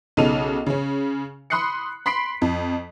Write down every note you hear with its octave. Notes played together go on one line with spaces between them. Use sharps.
B1 C#3 D#4 A4 D#7 F7
C#3 C#4
B5 C6 D#6 F#6 C7 C#7
B5 C6 B6 C7 D7
F2